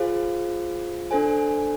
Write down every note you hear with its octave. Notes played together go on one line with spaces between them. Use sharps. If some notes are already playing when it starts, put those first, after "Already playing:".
Already playing: F4 G#4 C5 F5
D4 A4 C5 G#5